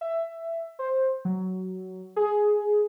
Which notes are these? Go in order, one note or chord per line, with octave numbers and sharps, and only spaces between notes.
E5
C5
F#3
G#4